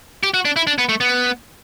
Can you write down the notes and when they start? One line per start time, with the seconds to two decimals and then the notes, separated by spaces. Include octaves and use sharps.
0.23 G4
0.34 F#4
0.45 D4
0.56 E4
0.67 D4
0.78 B3
0.89 A3
1.01 B3